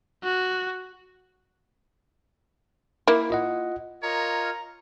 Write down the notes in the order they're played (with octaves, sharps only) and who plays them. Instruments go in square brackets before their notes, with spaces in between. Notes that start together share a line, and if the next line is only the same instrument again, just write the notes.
[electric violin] F#4
[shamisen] A#3 E4
[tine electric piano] F4 D#5 F#5
[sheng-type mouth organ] F4 A#4 D#5 [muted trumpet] C#5 [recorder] A#5